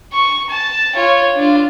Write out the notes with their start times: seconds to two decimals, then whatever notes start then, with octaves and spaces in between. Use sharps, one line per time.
0.13 C#6
0.49 A5
0.95 F4 C#5
1.36 D4 F4